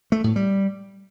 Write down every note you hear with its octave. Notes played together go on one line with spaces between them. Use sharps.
A3
A2
G3